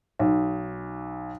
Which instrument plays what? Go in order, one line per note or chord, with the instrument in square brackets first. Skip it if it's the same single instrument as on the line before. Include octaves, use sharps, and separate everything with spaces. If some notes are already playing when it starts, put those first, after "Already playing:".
[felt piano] B1